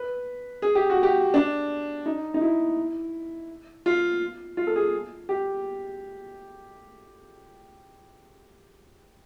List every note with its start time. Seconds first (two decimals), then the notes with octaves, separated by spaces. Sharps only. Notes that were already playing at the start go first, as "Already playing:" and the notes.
Already playing: B4
0.62 G#4
0.75 G4
0.90 F#4
1.03 G4
1.34 D4
2.06 D#4
2.34 D#4
2.41 E4
3.86 F4
4.57 F4
4.67 A4
4.76 G#4
5.29 G4